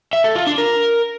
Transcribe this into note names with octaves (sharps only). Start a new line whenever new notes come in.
E5
A4
F4
D4
A#4